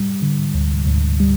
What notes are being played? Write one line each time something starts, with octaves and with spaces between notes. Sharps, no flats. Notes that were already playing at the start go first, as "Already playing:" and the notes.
Already playing: G3
D3
D2
D2
G3